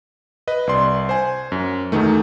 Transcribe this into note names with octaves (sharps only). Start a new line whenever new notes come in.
B4 D#5
C2 D5 C6
C5 G#5
F#2
E2 B2 D#3 A3